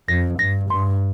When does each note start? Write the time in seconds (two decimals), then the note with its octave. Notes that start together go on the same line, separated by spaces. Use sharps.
0.08 F2 A#6
0.39 G2 A#6
0.70 G2 C6